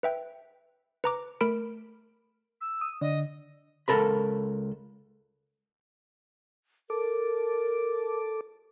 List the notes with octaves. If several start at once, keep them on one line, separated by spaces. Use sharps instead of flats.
B4 E5 G5
B4 A#5 D6
A3 A#4 B5 D7
E6
D#6
D3 D#5
C#2 C3 A4 A#4 B5
A4 A#4 D6